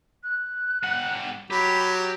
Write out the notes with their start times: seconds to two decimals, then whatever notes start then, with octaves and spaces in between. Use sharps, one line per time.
0.23 F#6
0.83 G3 F#5
1.50 F#3 G4 B5